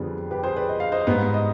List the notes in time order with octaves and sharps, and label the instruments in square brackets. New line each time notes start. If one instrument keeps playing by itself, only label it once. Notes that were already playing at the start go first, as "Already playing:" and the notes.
Already playing: [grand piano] F2 D3 G3 B3 G#4
G4 B4
G#4 C5
B4 D5
D#5
F5
C5 D#5
G#2 G3 B3
D#5